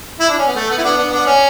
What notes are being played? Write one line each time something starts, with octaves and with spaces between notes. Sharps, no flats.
E4
D4
C#4
B3
A3
B3
E4
B3 D4
B3 D4
B3 D4
C#4